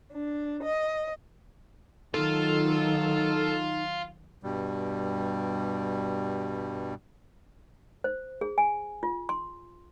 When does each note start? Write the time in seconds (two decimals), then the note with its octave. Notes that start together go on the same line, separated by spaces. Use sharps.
0.13 D4
0.62 D#5
2.14 D#3 F#3 D#4 F4 A4
4.43 G2 B2 G3
8.04 C5
8.41 G#4
8.58 G#5
9.03 F4
9.29 C6